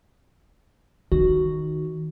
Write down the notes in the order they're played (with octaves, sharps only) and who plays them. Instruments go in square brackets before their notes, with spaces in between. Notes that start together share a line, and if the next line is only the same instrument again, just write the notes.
[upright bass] D#3 [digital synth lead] F#4